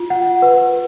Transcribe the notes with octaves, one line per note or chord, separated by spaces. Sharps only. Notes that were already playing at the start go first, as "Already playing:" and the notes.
Already playing: F4
F#5
B4